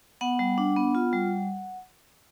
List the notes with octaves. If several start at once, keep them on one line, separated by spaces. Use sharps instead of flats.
B3 F#5
G3
D4
B3
F4
G3